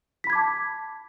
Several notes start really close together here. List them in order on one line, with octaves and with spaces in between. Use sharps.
B6 B5 G#6 D6 A5